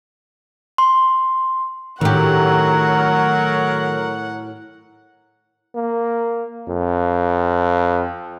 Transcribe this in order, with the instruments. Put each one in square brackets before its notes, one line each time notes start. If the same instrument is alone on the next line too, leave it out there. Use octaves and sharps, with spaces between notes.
[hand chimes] C6
[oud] A2 G4 [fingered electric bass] D#3 D4 [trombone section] F#3 A#4 [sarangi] F#5
[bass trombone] A#3
F2